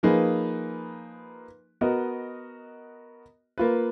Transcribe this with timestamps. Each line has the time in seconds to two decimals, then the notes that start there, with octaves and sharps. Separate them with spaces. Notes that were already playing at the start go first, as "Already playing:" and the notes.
0.03 F3 A#3 D#4 G#4 B4
1.81 B3 F#4 A#4 D#5
3.58 A#3 F4 B4